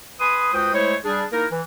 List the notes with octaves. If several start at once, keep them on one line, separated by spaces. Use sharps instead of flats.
B4 G#5 C6 D#6
C#2 F#4 B4 C5 G5 D#6
G#3 A3 E4 C5 C#5
G3 D4 G#4
A#3 D#4 E4 A#4
E3